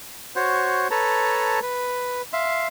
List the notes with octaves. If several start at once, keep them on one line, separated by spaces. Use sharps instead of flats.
F#4 C5 C#5
A4 B4 C#5 A5 A#5
B4
E5 F5 C6